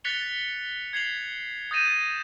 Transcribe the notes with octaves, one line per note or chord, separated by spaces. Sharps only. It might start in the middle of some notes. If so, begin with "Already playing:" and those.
F#6 A6 B6 C#7 F7 G7
G#6 C7 F7 F#7
D#6 G6 A6 A#6 D#7 E7